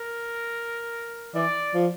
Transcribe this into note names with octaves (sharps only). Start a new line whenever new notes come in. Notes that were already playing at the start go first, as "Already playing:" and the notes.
Already playing: A#4
E3 D5
F3